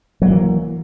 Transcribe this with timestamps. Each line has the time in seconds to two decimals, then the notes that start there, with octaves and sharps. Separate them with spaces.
0.22 F#3
0.26 A#3
0.30 E3